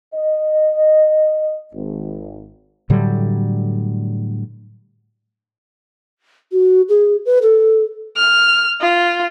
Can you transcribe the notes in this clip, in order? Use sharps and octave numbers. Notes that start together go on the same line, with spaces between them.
D#5
G#1
A2 D3 F#3 G3
F#4
G#4
B4
A4
F6
F4